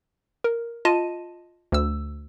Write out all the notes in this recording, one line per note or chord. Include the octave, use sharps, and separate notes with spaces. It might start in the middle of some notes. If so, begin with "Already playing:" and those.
A#4
F4 D#5 A5 D#7
D2 E6